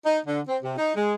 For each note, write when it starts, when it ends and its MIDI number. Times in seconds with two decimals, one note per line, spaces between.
0.06 0.20 63
0.26 0.40 50
0.48 0.58 60
0.63 0.73 48
0.78 0.95 63
0.95 1.14 56